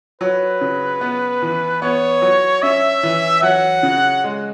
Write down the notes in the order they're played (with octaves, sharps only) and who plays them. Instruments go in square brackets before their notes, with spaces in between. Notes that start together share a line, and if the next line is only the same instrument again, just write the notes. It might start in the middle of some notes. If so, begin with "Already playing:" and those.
[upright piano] F#3 [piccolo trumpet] B4
[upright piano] C#3
B3
E3
[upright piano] B3 [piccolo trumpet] C#5
[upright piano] F#3
[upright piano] C#4 [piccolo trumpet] E5
[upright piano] E3
[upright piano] F#3 [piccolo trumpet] F#5
[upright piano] C#3
G#3